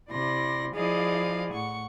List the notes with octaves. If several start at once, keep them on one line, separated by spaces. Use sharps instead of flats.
C3 E4 D5 C6 A#6
F3 E4 G#4 D5 D#5 F5
A2 F#5 C#6